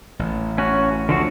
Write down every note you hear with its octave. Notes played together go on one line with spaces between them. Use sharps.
A1
C#4 F#4
D2 D3 F3 F#4